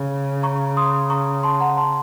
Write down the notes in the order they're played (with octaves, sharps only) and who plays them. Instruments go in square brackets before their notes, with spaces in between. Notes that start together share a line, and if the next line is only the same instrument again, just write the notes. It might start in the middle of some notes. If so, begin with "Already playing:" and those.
Already playing: [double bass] C#3
[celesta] A#5 C#6
C6 D#6
A#5 C#6
A5 C6
F#5 A#5
A5 C6